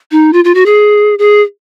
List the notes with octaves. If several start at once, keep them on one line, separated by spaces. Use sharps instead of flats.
D#4
F4
F4
F#4
G#4
G#4